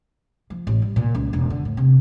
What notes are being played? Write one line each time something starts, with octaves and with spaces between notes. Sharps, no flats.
F3
A1
G3
A#2
C#2
E1
D3
A2
C3